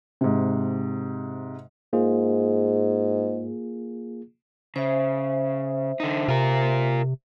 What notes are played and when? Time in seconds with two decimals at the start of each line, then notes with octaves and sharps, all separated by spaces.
0.21 G#2 C3
1.93 G#2 A#3 F4 G#4
4.76 C#3 C5 E5
6.00 D3 D#4
6.28 C3 F4 A#4